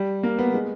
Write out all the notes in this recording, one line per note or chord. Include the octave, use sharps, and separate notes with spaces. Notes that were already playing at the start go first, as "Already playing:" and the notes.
Already playing: G3
A#3
B3
G#3